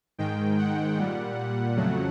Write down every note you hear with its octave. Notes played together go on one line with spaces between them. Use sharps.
G#2 D#3 G#3 G5
F#5
A#2 G3
F2 C#3 F#3 A3